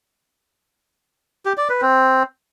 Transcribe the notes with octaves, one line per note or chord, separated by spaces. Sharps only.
G4
D5
B4
C4